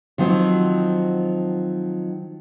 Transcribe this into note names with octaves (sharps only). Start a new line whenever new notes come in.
D#3 F3 F#3 C4